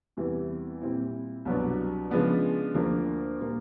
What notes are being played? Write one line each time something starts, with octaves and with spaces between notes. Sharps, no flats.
E2 C3 E3 G3
A#2 G3 C4 E4
C2 B2 F#3 B3 D4
C#3 F3 G#3 B3 D4
D2 D3 F3 A#3 D4
A#2 G3 A#3